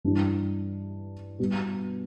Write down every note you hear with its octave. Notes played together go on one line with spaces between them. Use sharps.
G2 E3 G3 D4
B2 G3 B3